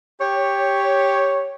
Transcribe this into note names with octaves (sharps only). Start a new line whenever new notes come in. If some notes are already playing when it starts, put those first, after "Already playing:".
G4 C#5